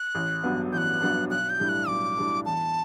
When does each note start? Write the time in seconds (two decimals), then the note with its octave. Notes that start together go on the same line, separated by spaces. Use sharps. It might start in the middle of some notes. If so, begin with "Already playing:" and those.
Already playing: F#6
0.15 A1
0.43 G2 F#3 B3 D4
0.72 A1 G6
0.78 F#6
1.01 G2 F#3 B3 D4
1.30 B1 F#6
1.50 G6
1.59 A2 G3 D4
1.69 F#6
1.88 B1 D6
2.17 A2 G3 D4
2.46 E2 A5